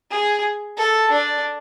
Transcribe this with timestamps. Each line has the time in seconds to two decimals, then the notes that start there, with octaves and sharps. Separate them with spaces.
0.11 G#4
0.77 A4
1.11 D4